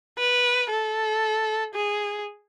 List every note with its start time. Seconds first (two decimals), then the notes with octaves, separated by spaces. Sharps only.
0.18 B4
0.70 A4
1.75 G#4